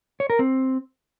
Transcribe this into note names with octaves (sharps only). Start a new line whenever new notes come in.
C#5
A#4
C4